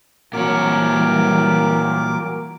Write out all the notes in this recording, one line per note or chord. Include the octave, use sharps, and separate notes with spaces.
A#2 E3 F#3 G3 A#4 C#5 D6